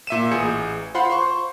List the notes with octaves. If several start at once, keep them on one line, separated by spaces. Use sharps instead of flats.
A#2 E5 D#7 E7
A1 G#4 G#5 G6 C#7
F4 C5 F5 F#5 B5 C6
C5 C6 C#6